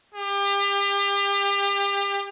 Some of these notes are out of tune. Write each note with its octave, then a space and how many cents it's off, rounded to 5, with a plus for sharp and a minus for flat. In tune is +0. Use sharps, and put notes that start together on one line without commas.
G4 +35